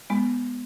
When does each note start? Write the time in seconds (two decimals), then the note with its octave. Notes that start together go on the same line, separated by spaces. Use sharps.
0.10 G#3 B3